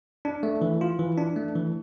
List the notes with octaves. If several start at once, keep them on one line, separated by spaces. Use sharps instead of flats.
D4
A3
E3
F4
E3
D4
A3
E3